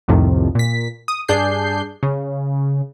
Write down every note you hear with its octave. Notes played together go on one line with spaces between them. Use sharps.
C2 F2 A2 C3 D#3 F3
A#2 B6
D#6
G2 D4 G#4 G6 C7
C#3